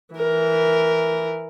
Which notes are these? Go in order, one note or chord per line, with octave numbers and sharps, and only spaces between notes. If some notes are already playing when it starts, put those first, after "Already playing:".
E3 A#4